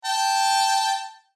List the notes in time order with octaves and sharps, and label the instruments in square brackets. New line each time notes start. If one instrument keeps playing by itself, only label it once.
[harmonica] G5 A5